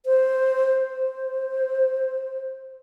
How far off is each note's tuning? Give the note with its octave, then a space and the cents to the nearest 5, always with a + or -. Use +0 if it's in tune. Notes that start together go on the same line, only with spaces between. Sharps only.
C5 +0
C5 +0